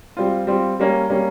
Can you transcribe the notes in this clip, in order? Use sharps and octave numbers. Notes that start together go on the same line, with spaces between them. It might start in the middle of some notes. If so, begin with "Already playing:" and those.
G3 C4 F4
G3 C4 F4
G3 A#3 C#4
G3 A#3 C#4